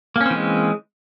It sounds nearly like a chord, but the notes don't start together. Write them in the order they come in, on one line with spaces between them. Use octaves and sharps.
A#3 C#4 C4 E3 G#3